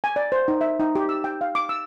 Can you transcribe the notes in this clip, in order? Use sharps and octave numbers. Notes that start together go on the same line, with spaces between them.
G#5
D5
C5
D#4
E5
D#4
G4
E6
G5
F5
D6
E6